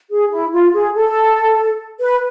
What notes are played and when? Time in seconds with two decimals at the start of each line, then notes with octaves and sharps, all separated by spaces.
0.10 G#4
0.30 E4
0.52 F4
0.73 G#4
0.95 A4
2.00 B4